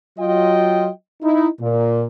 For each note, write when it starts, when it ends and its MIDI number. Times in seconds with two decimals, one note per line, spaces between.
0.19 0.89 54
0.19 0.89 65
0.19 0.89 75
0.19 0.89 79
1.23 1.47 63
1.23 1.47 64
1.61 2.05 46